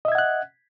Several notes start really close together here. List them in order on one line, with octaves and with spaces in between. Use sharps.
D#5 E5 G#6 F#5 F#6